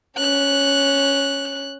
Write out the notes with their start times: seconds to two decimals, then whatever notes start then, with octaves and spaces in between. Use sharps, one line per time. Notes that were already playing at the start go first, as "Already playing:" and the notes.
0.18 C#4 F#6